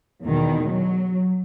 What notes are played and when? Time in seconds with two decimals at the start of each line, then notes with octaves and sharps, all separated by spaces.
0.23 E2 B2 D#3
0.69 F#3